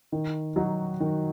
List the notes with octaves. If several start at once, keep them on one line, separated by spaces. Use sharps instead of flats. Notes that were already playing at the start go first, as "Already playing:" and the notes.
D#3
F#3 D#4 F#4
D#3